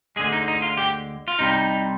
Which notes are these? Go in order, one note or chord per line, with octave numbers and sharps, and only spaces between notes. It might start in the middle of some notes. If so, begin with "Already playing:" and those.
D2 D3 G#3 G#4
D#4
D#4
F4
G4
F4
C2 C3 G3 D#4